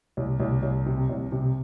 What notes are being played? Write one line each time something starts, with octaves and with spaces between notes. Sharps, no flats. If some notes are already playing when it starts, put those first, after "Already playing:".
C2
C2
C2
C3
C2
C3